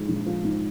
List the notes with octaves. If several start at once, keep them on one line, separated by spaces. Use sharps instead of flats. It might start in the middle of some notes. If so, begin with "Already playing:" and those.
Already playing: G#2 F3 G#3
A#1
F3
G#2